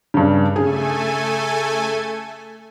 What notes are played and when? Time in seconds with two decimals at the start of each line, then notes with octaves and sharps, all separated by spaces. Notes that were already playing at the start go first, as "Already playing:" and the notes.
0.14 G2 C#3
0.56 C#3 A3 G#4 A4 G#5